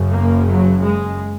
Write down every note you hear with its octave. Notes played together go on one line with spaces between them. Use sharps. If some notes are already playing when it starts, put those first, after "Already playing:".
Already playing: F#1 F#2 C#3
A#3
F#3
G#3